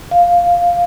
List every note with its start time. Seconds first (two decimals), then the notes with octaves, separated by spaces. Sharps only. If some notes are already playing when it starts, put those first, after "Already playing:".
0.11 F5